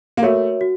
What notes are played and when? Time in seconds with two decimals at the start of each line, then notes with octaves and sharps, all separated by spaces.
0.17 A#3
0.22 A3 F#4 A#4 C#5 E5
0.61 F#4